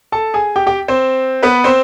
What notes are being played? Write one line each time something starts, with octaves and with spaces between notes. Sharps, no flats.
A4 A5
G#4 G#5
G4 G5
G4 G5
C4 C5
B3 B4
C4 C5